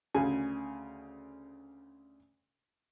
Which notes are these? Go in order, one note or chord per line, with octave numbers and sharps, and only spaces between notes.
D2 C#3 G#5